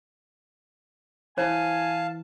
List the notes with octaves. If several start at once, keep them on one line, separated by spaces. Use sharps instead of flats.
E3 E4 C5 F5 G#5 A5